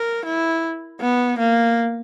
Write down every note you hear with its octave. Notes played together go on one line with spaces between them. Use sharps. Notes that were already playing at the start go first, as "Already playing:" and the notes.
Already playing: A#4
E4
B3
A#3